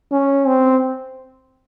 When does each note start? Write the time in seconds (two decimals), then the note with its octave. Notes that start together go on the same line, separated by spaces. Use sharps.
0.11 C#4
0.47 C4